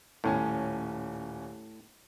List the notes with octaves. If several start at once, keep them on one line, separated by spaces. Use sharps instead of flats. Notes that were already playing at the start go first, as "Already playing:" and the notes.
D#1 A2 C#4 G#5